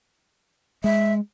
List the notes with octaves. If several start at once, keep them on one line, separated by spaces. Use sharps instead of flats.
G#3 E5